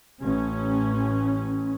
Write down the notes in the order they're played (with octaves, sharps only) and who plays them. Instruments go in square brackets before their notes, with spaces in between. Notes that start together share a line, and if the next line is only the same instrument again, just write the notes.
[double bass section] A1 C#4